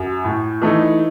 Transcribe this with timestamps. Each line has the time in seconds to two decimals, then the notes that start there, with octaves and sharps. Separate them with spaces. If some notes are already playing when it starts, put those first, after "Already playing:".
Already playing: F#2
0.25 A2
0.62 E3 A3 D#4